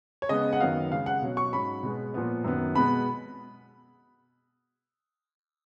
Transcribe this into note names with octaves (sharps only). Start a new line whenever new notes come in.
C#5
C#3 G#3 B3 D#5
F#5
F#2 D#3 F#3 B3 F5
C#3 G#3 C#4 F5
F#5
B2 F#3 C#4
C#6
G#2 F#3 C#4 B5
B2 G#3 B3
A#2 F3 B3
F#2 D#3 F#3 B3
B2 G#3 B3 B5